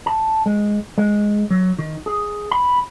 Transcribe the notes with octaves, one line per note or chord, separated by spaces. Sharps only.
A5
G#3
G#3
F#3
D#3
G#4
B5